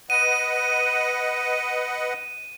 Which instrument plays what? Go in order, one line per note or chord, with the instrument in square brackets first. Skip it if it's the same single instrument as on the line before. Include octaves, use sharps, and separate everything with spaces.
[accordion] B4 D#5 F#5 [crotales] D#7